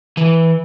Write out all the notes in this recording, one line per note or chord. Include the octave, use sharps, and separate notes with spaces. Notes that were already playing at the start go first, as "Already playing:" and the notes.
E3